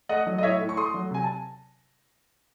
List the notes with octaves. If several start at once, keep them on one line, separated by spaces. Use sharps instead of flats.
A3 D#5 F#5
F#3
D#5
A2 C#5 E5
A2
C#6
A3 C6 D#6
F#3
C3 G#5
A5